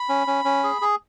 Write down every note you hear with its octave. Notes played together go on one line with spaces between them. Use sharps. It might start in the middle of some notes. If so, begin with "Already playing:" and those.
Already playing: B5
C#4
C#4
C#4
G#4
G#4